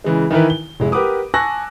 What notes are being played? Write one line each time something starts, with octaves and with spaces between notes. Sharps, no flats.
C#3 E3 G#3
D#3 E3 E4 A#4 B4
G7
F1 G#3 E4
G4 A#4 B4 F#5 D6 D#6
G#5 A5 C#6 E6 F#6 A#6